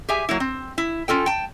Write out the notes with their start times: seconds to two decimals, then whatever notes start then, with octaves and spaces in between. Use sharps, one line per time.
0.09 G4 G#4 E5 G#5
0.29 F#3 A#3 E4
0.40 C4
0.78 E4
1.08 C#4 F4 A4 G5
1.26 G5 A5